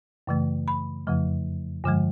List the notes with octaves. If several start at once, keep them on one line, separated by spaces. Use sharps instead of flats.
F#2 C#3 E3 A3
B5
F2 C#3 F3 A3
G2 D3 F3 G#3